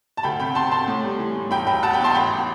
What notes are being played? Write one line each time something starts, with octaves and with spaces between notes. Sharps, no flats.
A5
D2 G5 B5
C3 G5 B5
C3 A5 C6
C3 A5 C6
A2
G3
E3
A2
E1 G5 B5
E1 G5 B5
E1 F#5 A5
G5 B5
E2 A5 C6
A1 G5 B5